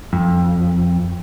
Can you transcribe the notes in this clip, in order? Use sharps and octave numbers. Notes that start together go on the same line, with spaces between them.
F2